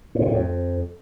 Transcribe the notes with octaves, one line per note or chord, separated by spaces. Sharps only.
A2
C3
A2
F2